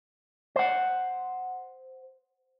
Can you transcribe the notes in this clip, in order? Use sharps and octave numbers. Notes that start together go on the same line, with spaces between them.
C5 F#5